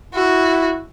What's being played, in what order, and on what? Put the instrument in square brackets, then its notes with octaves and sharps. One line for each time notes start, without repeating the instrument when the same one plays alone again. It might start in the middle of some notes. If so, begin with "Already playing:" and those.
[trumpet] E4 [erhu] F#4